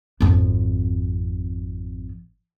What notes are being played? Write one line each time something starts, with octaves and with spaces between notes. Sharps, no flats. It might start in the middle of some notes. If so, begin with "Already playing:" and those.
G#1 F2